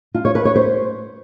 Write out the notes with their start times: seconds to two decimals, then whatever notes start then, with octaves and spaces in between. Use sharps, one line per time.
0.14 F4
0.25 C#5
0.35 B4
0.45 C#5
0.55 C5